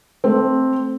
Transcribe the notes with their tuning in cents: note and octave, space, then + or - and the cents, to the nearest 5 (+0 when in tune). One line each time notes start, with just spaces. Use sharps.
A3 +0 C4 +5